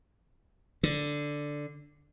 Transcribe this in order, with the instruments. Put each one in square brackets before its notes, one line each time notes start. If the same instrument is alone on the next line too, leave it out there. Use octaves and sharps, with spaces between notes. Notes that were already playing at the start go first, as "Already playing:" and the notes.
[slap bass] D3